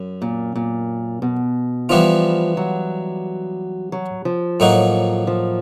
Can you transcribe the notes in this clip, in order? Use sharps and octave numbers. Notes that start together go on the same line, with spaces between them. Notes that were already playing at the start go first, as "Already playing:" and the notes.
Already playing: F#2
A#2
A#2
B2
E3 F3 G3 B3 D4 F4
F#3
F#3
F3
A2 F#3 A#3 D#4 F#4
F3